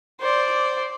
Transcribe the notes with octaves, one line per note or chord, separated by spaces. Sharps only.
C5 D5